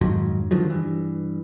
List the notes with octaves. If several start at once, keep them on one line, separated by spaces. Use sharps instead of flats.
F2 G#2 D#3 F#3
D3 D#3 F3 F#3
G2 E3